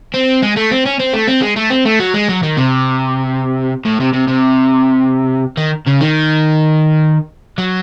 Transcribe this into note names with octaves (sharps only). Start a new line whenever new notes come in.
C4
G#3
A3
C4
C#4
C4
A3
C4
G#3
A3
C4
A3
F#3
G#3
F#3
D#3
C3
A2
C3
C3
C3
D#3
C#3
D#3
F#3